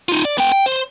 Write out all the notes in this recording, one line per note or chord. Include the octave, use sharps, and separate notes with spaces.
D#4 F4
D5
B3 G5
G5
C5